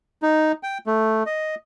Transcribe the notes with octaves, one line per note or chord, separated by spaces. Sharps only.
D#4
G5
A3
D#5